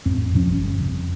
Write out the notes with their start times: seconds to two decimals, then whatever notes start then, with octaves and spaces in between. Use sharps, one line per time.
0.06 A1 F2 C4
0.33 D1 A#2 F3 C#4
0.49 G1
0.79 F2 C#3